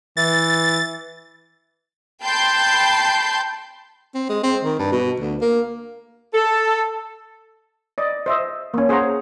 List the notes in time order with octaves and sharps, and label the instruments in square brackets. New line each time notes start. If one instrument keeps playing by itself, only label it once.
[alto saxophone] E3 [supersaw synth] A6
[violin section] G5 A5 B5 C6 G6
[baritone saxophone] C4
G#3
C4
D#3
G2
B2
D2
A#3
[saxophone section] A4
[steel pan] D5 D#5
C5 D#5 E5
A#3 C#4
G#4 C5 C#5 F#5 A#5